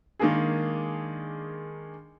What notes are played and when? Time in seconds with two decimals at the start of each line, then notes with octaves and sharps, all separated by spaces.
0.19 D#3 G#3 A#3 D4 G#4